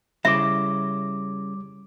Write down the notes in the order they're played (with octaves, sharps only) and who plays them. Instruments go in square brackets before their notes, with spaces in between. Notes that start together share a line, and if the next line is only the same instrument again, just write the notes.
[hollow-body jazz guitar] C#3 E4 C5 [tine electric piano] G3 D6 [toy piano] E5